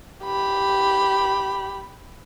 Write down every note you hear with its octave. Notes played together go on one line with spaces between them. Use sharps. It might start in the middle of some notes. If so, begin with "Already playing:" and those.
G4 B5